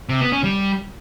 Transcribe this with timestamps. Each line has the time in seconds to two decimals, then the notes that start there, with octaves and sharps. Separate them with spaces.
0.09 C3
0.21 B3
0.32 C#4
0.44 G3